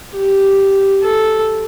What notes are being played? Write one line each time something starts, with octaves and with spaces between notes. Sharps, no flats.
G4
A4